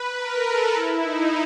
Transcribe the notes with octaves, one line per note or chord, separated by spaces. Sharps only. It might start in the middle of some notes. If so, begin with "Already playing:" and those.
Already playing: B4
A#4
A4
E4
D#4